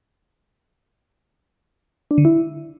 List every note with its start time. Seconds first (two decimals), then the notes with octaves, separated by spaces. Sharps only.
2.11 D4
2.18 D3
2.25 E4